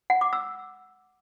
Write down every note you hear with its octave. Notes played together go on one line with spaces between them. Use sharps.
F#5
D6
E6